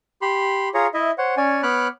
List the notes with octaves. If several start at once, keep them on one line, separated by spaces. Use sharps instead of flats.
G4 B5 C6
F4 G#4 C#5 A#5 C#6
E4 D#5 E5
C5 C#5 F#5
C#4 C#5 D5 G#5
B3 C#5 B5 D6 F6 F#6